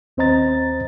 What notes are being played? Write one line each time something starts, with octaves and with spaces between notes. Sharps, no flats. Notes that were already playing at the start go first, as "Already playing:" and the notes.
D#2 C4 C5 D#5 A#5 A6